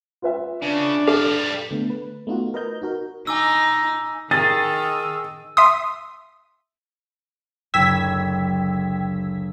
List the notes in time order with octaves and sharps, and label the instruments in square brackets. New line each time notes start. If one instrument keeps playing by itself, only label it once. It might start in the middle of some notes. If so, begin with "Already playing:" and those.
[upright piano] F4 B4 E5
[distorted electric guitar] C#3 [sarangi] D4
[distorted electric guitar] G3 F5 [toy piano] A4
[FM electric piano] D3 A3 B3
B4
A3 B3 D#4 F4 F#4
A#4 B4 D#5 A#5 G6
D#4 F#4 A#4
[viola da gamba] D#4 [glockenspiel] G#5 D6 E6
[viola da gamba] D#3 [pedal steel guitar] G#4 A#4 D#5 [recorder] E6 [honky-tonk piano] A6
[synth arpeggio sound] E5 C6 D#6
[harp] F#1 D2 C#3 [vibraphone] G5 [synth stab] E6 G#6 B6